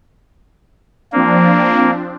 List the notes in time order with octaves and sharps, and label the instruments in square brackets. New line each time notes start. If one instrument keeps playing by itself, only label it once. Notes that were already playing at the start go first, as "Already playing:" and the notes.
[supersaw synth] F3 C4 D4 [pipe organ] A#3